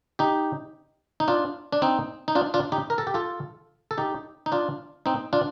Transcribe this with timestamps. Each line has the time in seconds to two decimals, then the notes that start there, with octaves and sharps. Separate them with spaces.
0.19 D#4 G4
1.20 D#4
1.28 D4 F4
1.72 D4
1.82 C4 D#4
2.28 D#4
2.35 D4 F4
2.54 D4 F4
2.72 D#4 G4
2.90 A#4
2.98 A4
3.07 G4
3.14 F4 A4
3.91 A4
3.98 D#4 G4
4.46 D#4
4.52 D4 F4
5.06 C4 D#4
5.33 D4 F4